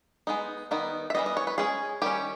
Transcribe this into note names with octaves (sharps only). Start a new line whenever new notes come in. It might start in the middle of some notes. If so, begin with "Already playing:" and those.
G#3 B3 D#4
D#3 G3 B3 D#4
E5
E3 G3 B3 D#5
D#5
C#5
B4
G#3 C#4 G#4
D#3 G3 C#4 G4